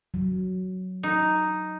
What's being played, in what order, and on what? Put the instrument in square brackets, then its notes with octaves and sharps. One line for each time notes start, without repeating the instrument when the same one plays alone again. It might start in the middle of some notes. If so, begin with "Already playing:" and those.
[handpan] F#3
[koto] D#4